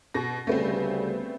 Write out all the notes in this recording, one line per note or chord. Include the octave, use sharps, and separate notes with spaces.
B2 A#6
D2 C#3 G3 A3 B3 C4